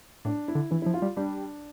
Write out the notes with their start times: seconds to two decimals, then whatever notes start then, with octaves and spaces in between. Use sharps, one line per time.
0.25 A2 D4
0.48 E4
0.55 D3
0.71 E3 E4
0.82 F3 E4
0.94 F4
1.02 G3
1.17 G3 D4